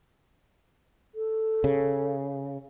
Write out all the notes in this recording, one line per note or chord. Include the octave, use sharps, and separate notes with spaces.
A4
C#3